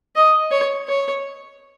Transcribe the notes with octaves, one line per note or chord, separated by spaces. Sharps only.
D#5
C#5
C#5